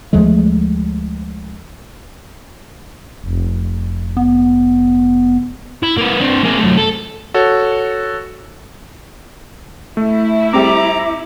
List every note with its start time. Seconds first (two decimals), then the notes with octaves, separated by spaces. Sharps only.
0.13 D2 F3 G#3 A3
3.24 F1
4.17 B3
5.83 E4
5.97 A#3 B4
6.21 C4 D4
6.44 A#3 G#4
6.60 F#2 A3
6.78 A4
7.34 F#4 A4 C#5
9.97 A3 E4
10.53 G3 C4 A#5 D6